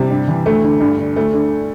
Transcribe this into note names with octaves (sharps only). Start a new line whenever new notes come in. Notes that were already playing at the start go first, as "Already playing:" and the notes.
Already playing: C3 G3
G2
E3
D2 A3
D3
G2
D3
D2 A3
D3